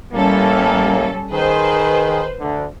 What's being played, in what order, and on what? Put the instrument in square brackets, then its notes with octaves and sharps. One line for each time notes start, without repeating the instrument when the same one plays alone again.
[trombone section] A1 A2 A#3 [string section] G3 C#4 A4
[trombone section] D#3 G#4 [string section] B4 C5
[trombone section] D2 D3